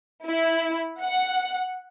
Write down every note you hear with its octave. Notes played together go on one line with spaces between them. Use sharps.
E4
F#5